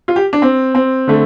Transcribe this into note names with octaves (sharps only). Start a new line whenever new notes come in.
F4
G4
D4
C4
C4
D3 A3